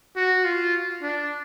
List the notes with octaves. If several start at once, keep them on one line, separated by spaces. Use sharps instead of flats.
F#4
F4
D4